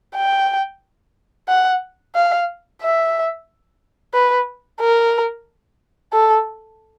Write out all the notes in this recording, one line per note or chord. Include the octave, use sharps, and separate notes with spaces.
G5
F#5
F5
E5
B4
A#4
A4